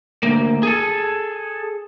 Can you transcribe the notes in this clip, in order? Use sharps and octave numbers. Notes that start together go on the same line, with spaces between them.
D2 A#3
G#4 A4